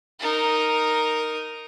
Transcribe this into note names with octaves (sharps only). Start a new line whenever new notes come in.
D#4 A#4